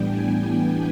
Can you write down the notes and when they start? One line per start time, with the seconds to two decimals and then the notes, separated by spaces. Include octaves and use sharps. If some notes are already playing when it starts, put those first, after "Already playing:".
Already playing: A2 E3 G3 B3 D4 G5
0.09 G#5